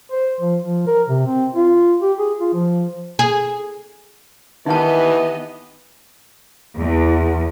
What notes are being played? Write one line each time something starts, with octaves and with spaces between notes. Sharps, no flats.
C5
F3
F3
A#4
C3
C4
F4
G4
G#4
F4
F3
G#4
D#3 E3 B3 D#4 G4 D#5 F#5 A5
E2